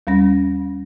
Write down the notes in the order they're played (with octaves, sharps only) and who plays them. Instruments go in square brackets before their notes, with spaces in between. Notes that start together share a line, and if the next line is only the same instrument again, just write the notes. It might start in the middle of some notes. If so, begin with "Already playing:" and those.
[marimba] D#2 G3 C#4 A#6